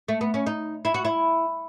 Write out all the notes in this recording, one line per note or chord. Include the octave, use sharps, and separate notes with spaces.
A3
B3
C#4
D#4
E4
F#4
E4